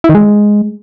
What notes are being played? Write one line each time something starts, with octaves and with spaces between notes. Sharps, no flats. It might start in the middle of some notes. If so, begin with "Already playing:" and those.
E4
D#3
G#3